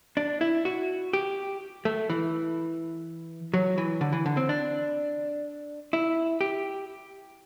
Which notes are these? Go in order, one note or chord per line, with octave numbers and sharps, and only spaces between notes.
D4
E4
F#4
G4
A3
E3
F#3
E3
D3
E3
D3
C4
D4
E4
G4